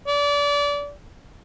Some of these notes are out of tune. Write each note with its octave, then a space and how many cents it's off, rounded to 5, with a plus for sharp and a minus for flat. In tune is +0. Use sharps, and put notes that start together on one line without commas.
D5 -30